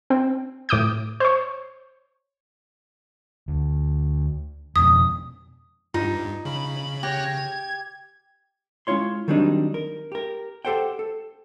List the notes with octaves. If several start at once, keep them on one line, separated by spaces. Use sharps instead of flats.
C4
A2 D6 D#6 G6
C5 C#5
D2
F2 B2 D#6
G2 D#4 F4
C#3 B5
G4 C#5 F#6 A#6
G#6
G#3 C#4 E4 F4 C#5 C6
D#3 F#3 G3 C4 D4 D#4
A#4
G4 A#4
G4 A4 C5 F#5 G5
A4